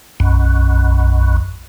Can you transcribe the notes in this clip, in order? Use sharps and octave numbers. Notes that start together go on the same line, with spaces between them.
B1 F#2